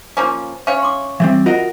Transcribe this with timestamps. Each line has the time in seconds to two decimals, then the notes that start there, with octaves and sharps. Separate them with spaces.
0.17 F3 A#3 C#4 G#5
0.67 C#4 C#5 E5 F5
0.82 C6 D6
1.20 E3 G3 C4 E5
1.46 F4 F#4 A#4 D#5 F#5